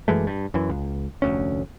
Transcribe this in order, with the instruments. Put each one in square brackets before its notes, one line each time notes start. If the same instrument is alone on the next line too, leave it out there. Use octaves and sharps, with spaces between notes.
[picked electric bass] F#2 E3 G#3 A3
G2
F#2 E3
C#2
F1 D2 C#4